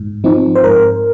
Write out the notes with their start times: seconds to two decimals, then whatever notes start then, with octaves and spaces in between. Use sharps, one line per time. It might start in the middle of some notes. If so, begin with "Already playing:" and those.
Already playing: G#2
0.24 F3 C4 D#4
0.55 C5
0.64 G#2 A#4